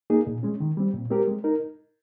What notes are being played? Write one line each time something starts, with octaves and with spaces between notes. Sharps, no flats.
A#3 D#4 G#4
A#2
G#3 C#4
D#3
G3 C4
A#2
G#3 C4 G4 A#4
G#3
D#4 A#4